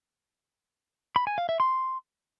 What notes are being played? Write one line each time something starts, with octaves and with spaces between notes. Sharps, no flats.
B5
G#5
F5
E5
C6